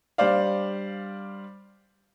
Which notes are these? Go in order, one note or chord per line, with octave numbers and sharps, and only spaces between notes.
G3 D4 C5 D5 F5